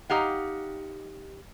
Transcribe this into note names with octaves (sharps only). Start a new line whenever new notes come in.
D#4 G4 F5 F#5